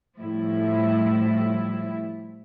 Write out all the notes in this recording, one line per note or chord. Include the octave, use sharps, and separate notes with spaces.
A2 F3 G3 E4